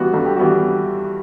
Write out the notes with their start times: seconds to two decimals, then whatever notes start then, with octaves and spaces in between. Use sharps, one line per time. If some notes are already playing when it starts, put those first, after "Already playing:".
Already playing: G2 E3 G3 B3 F#4
0.13 G2 A4
0.25 G4
0.36 E3 G3 B3 F#4